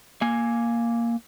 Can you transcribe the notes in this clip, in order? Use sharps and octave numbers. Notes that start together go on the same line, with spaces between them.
A#3 G#5